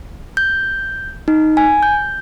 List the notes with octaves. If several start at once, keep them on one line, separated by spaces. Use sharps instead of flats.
G6
D#4
G#5
G6